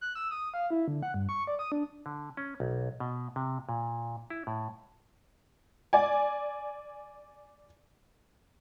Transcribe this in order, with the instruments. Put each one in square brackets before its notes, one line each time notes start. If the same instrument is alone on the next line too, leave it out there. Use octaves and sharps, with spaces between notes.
[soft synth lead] F#6
E6
D#6
F5
E4
D3
F#5
G2
C#6
D5
D#6
D4
[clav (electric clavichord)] D3
C#4
B1
B2
C3
A#2
E4
A2
[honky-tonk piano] D5 G#5